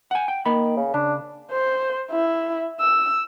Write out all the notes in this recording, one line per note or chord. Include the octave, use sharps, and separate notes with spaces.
F#5 G#5
G5
D#3 A#3 B5
C#3
C#3 D4
C5
E4
E6